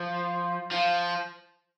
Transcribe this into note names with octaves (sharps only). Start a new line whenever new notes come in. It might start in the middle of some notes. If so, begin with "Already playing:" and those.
Already playing: F3
F3